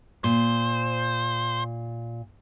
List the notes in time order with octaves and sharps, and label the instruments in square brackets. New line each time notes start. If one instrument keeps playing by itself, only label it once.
[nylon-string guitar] A#2 [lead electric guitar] C5